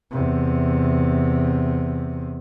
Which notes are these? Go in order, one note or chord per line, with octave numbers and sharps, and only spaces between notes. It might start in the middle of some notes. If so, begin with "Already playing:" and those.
E2 C3